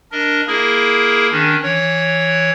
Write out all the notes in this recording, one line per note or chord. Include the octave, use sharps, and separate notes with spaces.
D4 A#4 D#5
A#3 E4 G#4 A#4
D#3 C#4 D4
E3 C#5